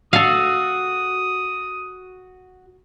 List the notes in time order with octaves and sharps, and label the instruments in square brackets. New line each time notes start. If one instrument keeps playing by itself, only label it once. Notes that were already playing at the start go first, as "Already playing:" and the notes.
[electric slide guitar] F#4 [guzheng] A4 F5 [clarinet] D#6